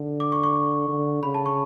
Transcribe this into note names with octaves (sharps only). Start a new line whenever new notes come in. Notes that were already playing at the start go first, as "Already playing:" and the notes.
Already playing: D3
D6
C#6
C#6
D3
C#3 B5
A5
C#6